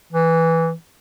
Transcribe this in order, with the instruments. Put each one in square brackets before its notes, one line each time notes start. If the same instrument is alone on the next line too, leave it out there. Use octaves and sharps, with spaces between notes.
[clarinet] E3